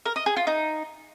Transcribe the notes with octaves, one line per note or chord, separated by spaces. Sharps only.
A#4
D#5
G#4
F4
D#4